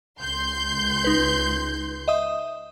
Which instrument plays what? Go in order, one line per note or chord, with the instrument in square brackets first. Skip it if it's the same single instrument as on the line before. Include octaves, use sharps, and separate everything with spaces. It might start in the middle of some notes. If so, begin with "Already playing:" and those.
[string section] C#2 C6 G6
[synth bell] D#4 B4
D#5 E5 D#6